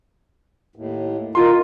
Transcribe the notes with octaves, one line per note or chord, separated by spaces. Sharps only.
D#2 A2
D#3 D#4 F4 C6